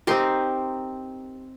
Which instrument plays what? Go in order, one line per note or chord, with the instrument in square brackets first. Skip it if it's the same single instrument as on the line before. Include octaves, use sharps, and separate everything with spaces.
[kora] C4 D#4 A#4 [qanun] G4 C6